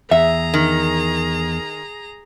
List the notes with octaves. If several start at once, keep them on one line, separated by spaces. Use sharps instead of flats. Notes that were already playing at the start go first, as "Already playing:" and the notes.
E2 G#4 E5 A#5
D#3